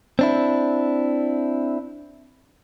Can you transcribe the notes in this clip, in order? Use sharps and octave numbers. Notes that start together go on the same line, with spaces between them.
C4 D4 E4